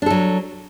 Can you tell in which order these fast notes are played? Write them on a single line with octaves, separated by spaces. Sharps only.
D4 A4 F#3